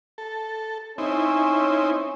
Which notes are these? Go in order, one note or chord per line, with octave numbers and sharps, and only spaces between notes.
A4
C4 C#4 D#4 E4